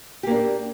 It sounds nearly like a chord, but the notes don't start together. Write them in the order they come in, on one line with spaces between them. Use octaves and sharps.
G4 A#3 D4